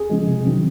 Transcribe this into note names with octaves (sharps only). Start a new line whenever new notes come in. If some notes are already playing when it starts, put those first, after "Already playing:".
Already playing: G#4
C#3 F3 G#3
C3
D#3 F#3 C4